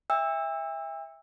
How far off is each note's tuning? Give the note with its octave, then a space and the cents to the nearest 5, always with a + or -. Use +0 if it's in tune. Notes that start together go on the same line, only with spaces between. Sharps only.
E5 -10 G5 +45 E6 +0